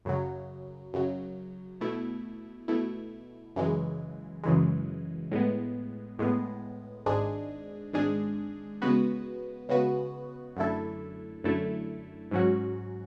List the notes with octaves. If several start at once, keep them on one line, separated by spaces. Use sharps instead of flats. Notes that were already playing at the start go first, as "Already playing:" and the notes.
F#2 C#3 F#3
F#2 C#3 F#3
B2 A3 E4
B2 A3 E4
F#2 C#3 E3 G#3
F#2 C#3 E3 G#3
A2 G#3 B3
A2 G#3 B3
G#1 G#2 G#3 D4 G#4
G#1 G#2 G#3 D4 G#4
C#3 G#3 B3 F#4 B4
C#3 G#3 B3 F#4 B4
F#2 D3 A3 E4 A4
F#2 D3 A3 E4 A4
G#2 F#3 C#4 F#4